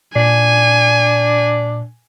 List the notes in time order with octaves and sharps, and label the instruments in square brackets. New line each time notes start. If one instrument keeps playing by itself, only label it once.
[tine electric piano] A#2 [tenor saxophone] D4 [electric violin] G#5